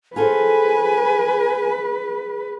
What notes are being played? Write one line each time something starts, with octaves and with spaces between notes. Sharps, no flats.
F4 G#4 A4 B4 C5 G#5